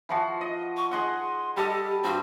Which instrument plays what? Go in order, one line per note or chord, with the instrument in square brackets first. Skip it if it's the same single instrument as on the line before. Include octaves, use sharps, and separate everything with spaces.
[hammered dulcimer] E3 F3 F#4
D#5
[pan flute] C#6
[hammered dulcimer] G#4 D#5 F#5 [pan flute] C6
[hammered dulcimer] G3 A4 D#5 [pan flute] G4
[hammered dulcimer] G2 C4 [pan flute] F#4